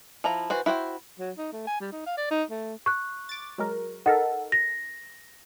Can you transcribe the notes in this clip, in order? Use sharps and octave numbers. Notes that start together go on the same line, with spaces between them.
F3 E4 A#5
E3 F#4 C5
E4 F#4 C5 G5
F#3
D#4
A3
G#5
G3
D#4
F5
D5
D#4
A3
C#6 F#6
D6 A6
F#3 G#3 A#4
D#4 A4 A#4 F#5
A#6